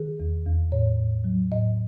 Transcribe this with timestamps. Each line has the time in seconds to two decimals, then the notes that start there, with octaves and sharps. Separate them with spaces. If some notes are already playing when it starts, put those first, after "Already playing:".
Already playing: D#3 G#4
0.20 E2
0.46 E2
0.72 A2 C#5
0.99 A2
1.24 F#3
1.52 A2 D#5